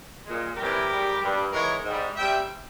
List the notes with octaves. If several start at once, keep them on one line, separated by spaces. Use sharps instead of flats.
A#2 G#3
C3 E3 G3 G4 A#4
G#2 G3
G2 G3
G#2 E3 G#3 A#4 C#5
G#2 G3
C3 G3 E5 G5